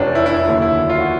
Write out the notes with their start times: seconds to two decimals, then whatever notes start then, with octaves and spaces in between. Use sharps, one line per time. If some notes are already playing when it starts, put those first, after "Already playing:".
Already playing: F1 E2 C3 F3 C#4 D4
0.15 E4
0.26 E4
0.37 E4
0.47 D#2 D3 F#3 E4
0.62 E4
0.90 F4
1.00 F#4